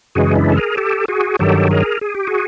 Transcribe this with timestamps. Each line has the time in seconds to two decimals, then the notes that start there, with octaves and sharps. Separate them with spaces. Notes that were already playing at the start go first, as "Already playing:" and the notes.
0.15 F#2 C#3 E3 G#3 F#4 G#4
0.36 D4 E4
0.51 A4
0.56 G#4 A#4
0.77 G4 A4
1.08 F#4 G#4
1.39 G2 D#3 F#3 G4 A4
1.71 G#4 A#4
2.01 G#4
2.15 G4
2.27 F#4 G#4